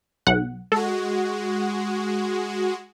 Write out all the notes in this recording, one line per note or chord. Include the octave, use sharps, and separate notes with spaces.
B1 F#5
G#3 F#4 A4